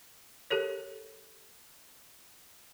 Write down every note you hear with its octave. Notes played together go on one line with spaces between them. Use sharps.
G4 A4 A#4 C#5